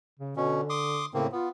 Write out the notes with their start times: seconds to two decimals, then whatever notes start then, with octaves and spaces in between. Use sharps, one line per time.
0.19 C#3
0.37 B2 D3 C#4
0.70 C6 D6 D#6
1.14 A2 C#3 A#3 C4
1.32 B3 F4